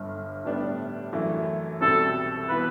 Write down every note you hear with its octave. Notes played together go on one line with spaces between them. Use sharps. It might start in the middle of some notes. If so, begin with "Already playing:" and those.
Already playing: G1 G2 D3
A2 G3 B3 D4
F#2 E3 A3 E4
C2 B2 G3 C4 A4
E3 B3 E4 B4